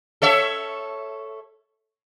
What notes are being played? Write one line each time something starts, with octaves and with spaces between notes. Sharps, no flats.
A4 C#5 E5